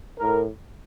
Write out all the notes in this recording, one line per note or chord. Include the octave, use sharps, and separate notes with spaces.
A2 A#4